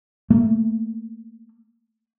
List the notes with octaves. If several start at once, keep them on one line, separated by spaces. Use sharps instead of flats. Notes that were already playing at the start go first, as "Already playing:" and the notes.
A3 A#3